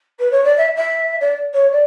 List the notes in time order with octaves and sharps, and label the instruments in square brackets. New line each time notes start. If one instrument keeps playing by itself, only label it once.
[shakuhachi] B4
C#5
D5
E5
E5
D5
C#5
D5